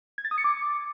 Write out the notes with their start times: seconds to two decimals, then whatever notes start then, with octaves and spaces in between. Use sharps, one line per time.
0.18 G#6
0.25 A6
0.31 D#6
0.38 C#7
0.44 D6